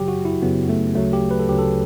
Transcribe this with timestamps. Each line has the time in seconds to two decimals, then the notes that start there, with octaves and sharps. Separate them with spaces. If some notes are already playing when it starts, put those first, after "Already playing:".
Already playing: F#2 C#3 F#3 G4
0.08 F#4
0.25 E4
0.42 F#2 C#3 F#3 B3
0.69 A3
0.95 D2 C#3 F#3 A3
1.13 G4
1.31 B4
1.39 A4
1.48 D2 C#3 F#3 G4
1.58 A4